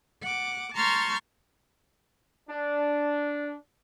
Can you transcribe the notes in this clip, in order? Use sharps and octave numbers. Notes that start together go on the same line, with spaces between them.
F#5 D6
A5 A#5 C6 C#6 F6 G6
D4